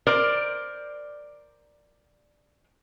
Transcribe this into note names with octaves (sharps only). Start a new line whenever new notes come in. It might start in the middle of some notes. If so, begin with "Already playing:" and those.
A#4 C5 D5